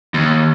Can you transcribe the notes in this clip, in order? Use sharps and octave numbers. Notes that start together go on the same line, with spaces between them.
D#2